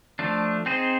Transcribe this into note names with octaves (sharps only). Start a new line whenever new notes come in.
F3 A3 D4
C4 D#4 G#4 C5